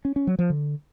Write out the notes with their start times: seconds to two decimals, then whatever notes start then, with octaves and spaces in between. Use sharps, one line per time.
0.05 C#4
0.16 C#4
0.27 F#3
0.39 F3
0.50 D3